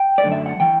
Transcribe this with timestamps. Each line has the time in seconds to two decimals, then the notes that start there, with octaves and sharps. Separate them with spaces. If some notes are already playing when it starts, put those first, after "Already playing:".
Already playing: G5
0.18 D5
0.23 F#2 D3 A3
0.32 E5
0.46 F#5
0.60 E3 G5